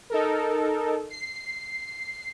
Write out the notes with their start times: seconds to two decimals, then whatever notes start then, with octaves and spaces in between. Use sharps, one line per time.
0.10 D#4 A4 A#4
1.10 C7